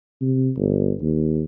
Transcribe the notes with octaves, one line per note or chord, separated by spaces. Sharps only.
C3
G1
D#2